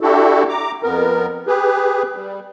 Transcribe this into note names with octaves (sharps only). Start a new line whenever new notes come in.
D4 E4 F#4 G4 A4
A#5 D6
F2 B3 A#4
G4 G#4 B4
G3